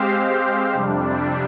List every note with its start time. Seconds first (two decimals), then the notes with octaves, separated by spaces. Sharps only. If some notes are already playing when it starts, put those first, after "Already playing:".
Already playing: G#3 C4 G4 C5 F5
0.73 F2 C3 G3 D4